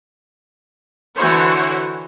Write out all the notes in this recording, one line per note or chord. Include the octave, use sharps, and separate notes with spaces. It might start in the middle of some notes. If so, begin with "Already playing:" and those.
D3 E3 F#4 C5 C#5